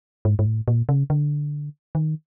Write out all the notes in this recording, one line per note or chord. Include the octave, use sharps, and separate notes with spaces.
G#2
G#2
A2
A#2
C#3
D3
D#3